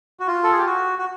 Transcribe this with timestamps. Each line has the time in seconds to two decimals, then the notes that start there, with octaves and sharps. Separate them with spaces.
0.20 F#4
0.27 F4
0.44 A4
0.51 G#4
0.58 G4
0.66 F#4
0.98 F#4